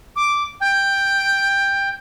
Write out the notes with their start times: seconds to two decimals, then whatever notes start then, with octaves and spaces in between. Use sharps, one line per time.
0.16 D6
0.61 G5